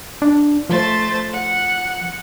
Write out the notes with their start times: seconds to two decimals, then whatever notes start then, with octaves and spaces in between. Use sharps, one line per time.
0.22 D4
0.69 F3 A3 C5 A6
1.32 F#5